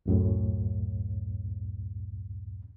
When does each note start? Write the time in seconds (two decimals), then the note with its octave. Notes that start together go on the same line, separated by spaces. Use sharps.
0.06 C#2 F#2 A2